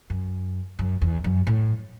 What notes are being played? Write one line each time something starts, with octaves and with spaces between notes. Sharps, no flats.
F#2
F#2
E2
F#2
A2